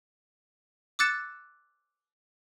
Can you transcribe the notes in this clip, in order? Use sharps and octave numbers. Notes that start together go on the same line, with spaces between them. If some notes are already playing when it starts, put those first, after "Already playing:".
D6 E6 F#6 A6 C#7 E7